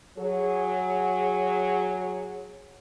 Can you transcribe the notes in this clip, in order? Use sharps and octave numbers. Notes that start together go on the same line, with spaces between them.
F#3 G#4